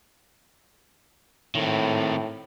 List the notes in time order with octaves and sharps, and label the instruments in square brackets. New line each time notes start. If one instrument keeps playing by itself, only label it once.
[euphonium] A2 [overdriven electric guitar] D#3 C4